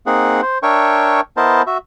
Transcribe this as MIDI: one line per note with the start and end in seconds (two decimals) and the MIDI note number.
0.06 0.41 58
0.06 0.41 60
0.06 0.41 63
0.06 0.41 68
0.06 0.41 78
0.42 0.58 72
0.63 1.21 62
0.63 1.21 70
0.63 1.21 73
0.63 1.21 76
0.63 1.21 79
0.63 1.21 85
1.37 1.62 59
1.37 1.62 64
1.37 1.62 70
1.37 1.62 72
1.37 1.62 75
1.37 1.62 81
1.67 1.78 66
1.67 1.78 76